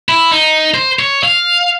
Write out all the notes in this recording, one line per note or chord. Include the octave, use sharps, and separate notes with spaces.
E4
D#4
C5
C#5
F5